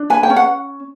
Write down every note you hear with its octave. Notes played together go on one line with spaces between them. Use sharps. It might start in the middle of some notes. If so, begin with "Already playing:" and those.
Already playing: D4
B4 G#5
G5
C#4
F#5